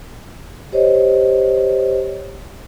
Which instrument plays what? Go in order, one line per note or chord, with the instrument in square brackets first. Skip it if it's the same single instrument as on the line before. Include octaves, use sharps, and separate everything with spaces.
[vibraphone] G4 C5 C#5 D#5